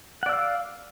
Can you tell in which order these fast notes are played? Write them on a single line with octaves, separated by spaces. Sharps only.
F#5 D5 E6 F5